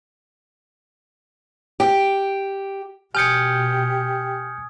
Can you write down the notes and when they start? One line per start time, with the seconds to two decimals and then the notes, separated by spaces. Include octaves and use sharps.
1.80 G4
3.15 B2 G4 G#5 D#6 F6 G6 G#6 C#7